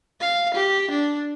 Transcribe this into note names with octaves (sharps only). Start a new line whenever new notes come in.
F5
G4
D4